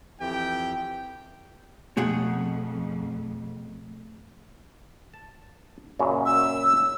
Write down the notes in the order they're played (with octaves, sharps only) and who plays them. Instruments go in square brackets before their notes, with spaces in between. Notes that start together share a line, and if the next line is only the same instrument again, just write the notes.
[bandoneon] F2 E3 G4 [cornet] G5
[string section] F2 [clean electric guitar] B2 [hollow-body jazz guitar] A3 G#4 F#5
[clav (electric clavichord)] A5
F#2 A#2 C#3
[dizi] E6